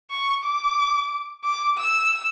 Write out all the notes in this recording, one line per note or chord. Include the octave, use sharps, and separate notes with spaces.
C#6
D6
D6
E6